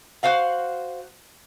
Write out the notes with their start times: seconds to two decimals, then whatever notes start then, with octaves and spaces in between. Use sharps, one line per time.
0.23 F#4 C5 F5 F#5